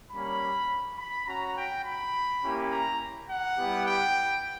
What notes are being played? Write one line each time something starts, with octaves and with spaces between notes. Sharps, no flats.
G3 A#3 C#4 B5
B5
C#4 F#4 A#5
G5
B5
A#3 C#4 E4 G4
A#5
F#5
G3 B3 E4 G4
G5